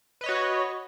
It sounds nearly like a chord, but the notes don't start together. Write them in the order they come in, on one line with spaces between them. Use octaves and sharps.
B4 D#5 C#5 F#4